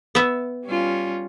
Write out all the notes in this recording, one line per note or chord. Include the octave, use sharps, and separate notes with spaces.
B3 E5
G3 C#4 F4